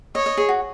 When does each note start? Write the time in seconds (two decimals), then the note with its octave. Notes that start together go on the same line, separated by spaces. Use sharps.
0.15 C#5 D#5
0.26 D#5
0.37 G#4
0.49 F#4